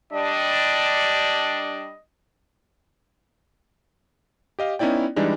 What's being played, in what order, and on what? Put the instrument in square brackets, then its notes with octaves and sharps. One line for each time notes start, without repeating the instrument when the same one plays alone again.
[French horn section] G3 D4 [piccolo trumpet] D#5
[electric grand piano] G4 D#5 F5
B3 C#4 D#4 E4 D5 G5
E3 G3 G#3 D4 D#4